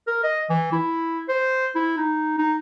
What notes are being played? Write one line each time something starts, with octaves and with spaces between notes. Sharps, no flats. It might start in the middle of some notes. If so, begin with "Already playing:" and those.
A#4
D#5
E3
E4
C5
E4
D#4
D#4